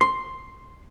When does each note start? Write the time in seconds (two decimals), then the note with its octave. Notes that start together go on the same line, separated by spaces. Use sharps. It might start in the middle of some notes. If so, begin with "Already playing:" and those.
0.01 C6